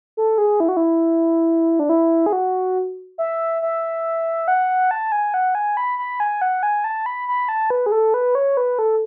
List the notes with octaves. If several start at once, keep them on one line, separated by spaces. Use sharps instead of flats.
A4
G#4
E4
F#4
E4
D4
E4
G#4
F#4
E5
E5
F#5
A5
G#5
F#5
G#5
B5
B5
G#5
F#5
G#5
A5
B5
B5
A5
B4
G#4
A4
B4
C#5
B4
A4